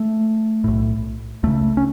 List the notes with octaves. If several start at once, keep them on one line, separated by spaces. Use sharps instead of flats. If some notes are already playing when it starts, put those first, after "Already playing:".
Already playing: A3
B1 A2
C#2 C#3 A3
C#4